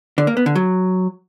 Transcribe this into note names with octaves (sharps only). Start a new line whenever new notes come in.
D3
A#3
B3
D3
F#3